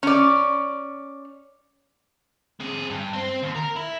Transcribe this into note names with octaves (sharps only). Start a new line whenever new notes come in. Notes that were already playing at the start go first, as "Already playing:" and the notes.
C#4 D5
C3 G#4
G2
C4 C5
D#2
A#4
E4